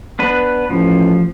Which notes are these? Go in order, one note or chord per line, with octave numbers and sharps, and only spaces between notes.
B3 D4 B4
A1 F3